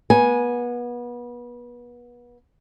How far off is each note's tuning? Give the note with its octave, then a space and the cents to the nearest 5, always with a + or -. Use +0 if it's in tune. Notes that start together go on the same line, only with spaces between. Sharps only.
B3 -30 G#5 +0